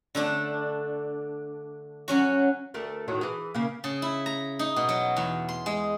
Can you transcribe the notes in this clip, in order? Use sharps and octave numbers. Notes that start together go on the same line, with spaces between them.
D3 A3 D4
F#3 C#4 F#4
D2 A3 A#4
A2 D#3 F#3
E3 G#4
C#3 A#3
C#3
E4
A#5
D#4
B2
F#3
E2
C6
G#3